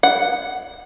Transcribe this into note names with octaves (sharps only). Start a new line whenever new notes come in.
F#5